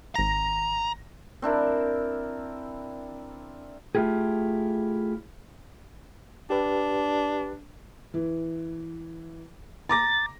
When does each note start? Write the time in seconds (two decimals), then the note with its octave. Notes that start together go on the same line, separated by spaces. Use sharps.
0.15 G#1 A#5 A#6
1.42 C4 D4 E4 A#4
3.95 A3 E4 F4 G4 G#4
6.50 D4 G4 B4
8.14 E3
9.89 A#5 D6 A6 A#6